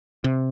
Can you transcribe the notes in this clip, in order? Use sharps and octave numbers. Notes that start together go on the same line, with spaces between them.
C3